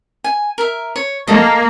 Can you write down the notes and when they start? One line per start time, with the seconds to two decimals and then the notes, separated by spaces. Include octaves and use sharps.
0.24 G#5
0.58 A#4 E5
0.96 C#5
1.27 A#3 A4 D#5